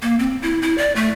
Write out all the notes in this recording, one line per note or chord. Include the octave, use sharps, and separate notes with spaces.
A#3
C4
E4
E4
D5
A3